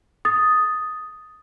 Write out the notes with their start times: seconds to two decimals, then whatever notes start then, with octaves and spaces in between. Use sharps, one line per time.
0.25 D#6 A6